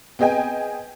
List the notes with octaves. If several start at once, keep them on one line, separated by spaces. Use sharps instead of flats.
B3 C4 G#4 D#5 G5 G#5